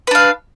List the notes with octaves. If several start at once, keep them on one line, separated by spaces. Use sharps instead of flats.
D4 B4 F5